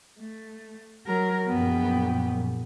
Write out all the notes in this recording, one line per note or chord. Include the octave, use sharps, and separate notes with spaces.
A3
F#3 A#4
A#1 F#2 B3 G5